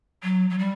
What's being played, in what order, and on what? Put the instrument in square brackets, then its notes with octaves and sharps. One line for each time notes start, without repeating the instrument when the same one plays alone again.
[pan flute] F#3
F#3
G3